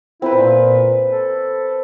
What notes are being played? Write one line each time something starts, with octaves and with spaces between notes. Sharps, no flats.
C4 E4 B4
A#2
A4